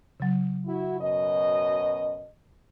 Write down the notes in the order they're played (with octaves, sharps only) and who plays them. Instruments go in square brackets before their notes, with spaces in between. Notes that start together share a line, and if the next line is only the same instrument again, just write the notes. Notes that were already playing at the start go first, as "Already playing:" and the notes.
[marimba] C#3 F#3
[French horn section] E4 F#4
F#2 B2 D#5